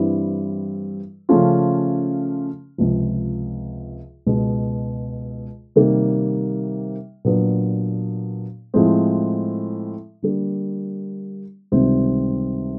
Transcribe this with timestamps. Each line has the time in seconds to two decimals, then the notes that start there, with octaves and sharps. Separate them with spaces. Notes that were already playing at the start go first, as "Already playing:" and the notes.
Already playing: G2 E3 G3 C4 E4
1.29 C#3 F3 A3 C#4 F4
2.78 C#2 C3 F3
4.27 C#2 B2 G#3
5.76 C3 D#3 G3 A#3
7.25 A#2 F#3 B3 D4
8.74 A2 F3 G#3 C4
10.22 D3 G3 A#3
11.72 C#2 C3 D#3 G3 C4